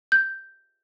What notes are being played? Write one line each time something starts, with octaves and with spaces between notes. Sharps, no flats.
G6